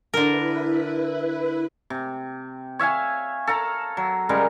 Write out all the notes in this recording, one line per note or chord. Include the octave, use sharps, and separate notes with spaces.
D3 E4 A#4 B4
C3
C#5 E5 F5 G#5
A4 F5 A#5
F#3
C#3 G3 G#3 A#4